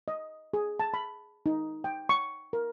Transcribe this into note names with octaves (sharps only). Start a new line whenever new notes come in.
D#5
G#4
A5
B5
D#4
G5
C#6
A#4